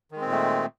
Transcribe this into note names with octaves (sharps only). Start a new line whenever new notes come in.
A#2 D#3 G#3 A3 C4